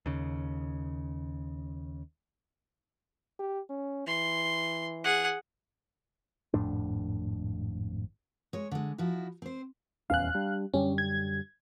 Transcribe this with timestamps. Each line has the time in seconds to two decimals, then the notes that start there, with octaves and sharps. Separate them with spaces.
0.06 D#2 C#3
3.39 G4
3.70 C#4
4.07 E3 C6
5.04 G#4 F#5
6.54 G#1 F2 A2 D4
8.53 G#3 C#5
8.71 D3 G#3
8.98 F3 D#4 E4 F#4
9.42 C4 C5
10.10 D#1 E2 C#4 F5 F#6
10.35 G3 D4
10.74 F#2 D3 G3 C#4
10.98 G#6